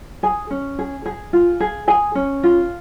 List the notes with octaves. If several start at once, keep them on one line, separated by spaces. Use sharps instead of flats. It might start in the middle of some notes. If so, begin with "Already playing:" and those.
G#4 G#5
C#4
G#4
G#4
F4
G#4
G#4 G#5
C#4
F4